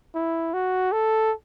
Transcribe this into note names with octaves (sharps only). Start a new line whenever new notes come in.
E4
F#4
A4